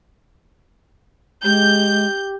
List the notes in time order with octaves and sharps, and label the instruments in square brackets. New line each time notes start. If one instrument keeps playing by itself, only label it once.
[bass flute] G#3 [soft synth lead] G4 [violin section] G6